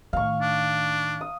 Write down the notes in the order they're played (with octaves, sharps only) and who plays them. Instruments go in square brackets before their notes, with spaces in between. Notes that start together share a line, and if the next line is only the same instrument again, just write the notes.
[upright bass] A2 D#3 [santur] F5 C#6
[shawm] D4
[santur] D#6